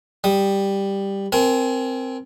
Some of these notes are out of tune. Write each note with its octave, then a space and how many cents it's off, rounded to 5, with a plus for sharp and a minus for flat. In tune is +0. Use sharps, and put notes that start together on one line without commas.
G3 +5 D#6 -10
C4 +0 A#4 +0 G#5 +25